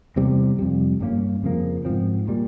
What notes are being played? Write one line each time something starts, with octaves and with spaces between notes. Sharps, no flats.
E2 C3 G3 C4
F2 C3 G3
G2 E3 A#3 C#4
F2 C#3 F3 A#3
G#2 F3 C4
A#2 G3 A#3